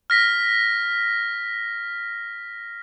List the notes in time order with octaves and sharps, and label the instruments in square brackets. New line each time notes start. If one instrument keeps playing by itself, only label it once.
[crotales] F6 A#6 B6